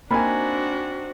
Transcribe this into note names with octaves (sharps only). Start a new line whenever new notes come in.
A#3 C4 D4 D#4 F#4 G#5 B5